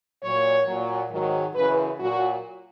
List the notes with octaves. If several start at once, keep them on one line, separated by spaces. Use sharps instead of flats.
A#2 F#3 C#5
A#2 F#3
G#2 D#3 F#3
F#2 C#3 E3 B4
A#2 F#3 F#4